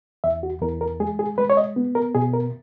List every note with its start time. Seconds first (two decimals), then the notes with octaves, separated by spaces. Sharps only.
0.24 E2 E5
0.43 F#4
0.62 E2 A#4
0.81 A#4
1.00 G#3 G#4
1.19 G#4
1.38 G#3 B4
1.50 C#5
1.57 D#5
1.76 B3
1.95 A#4
2.15 B2 G#4
2.33 A#4